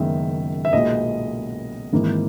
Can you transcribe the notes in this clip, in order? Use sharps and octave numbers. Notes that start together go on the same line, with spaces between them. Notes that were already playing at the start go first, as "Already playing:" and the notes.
Already playing: F#1 F#2 D#3 G#3 B3 E5
E5
B1 A#2 G#3 B3 D#5
G#1 G#2 E3 A#3